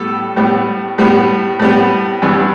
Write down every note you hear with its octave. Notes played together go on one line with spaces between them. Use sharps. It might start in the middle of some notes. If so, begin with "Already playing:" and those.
Already playing: A2 G3 B3 A4
A2 G3 B3
A2 G3 B3
A2 G3 B3
G2 E3 G3 B3